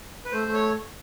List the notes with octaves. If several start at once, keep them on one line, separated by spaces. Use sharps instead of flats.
B4
A3 C5
A3
C#5